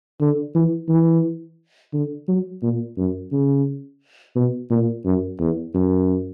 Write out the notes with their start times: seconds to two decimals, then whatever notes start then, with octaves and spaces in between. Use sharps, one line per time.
0.21 D3
0.55 E3
0.89 E3
1.93 D3
2.28 F#3
2.63 A#2
2.98 F#2
3.32 C#3
4.36 B2
4.70 A#2
5.05 F#2
5.40 E2
5.75 F#2